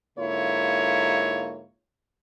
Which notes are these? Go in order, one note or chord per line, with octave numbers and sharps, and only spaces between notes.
G#2 D3 A#3 E4 F4 C#5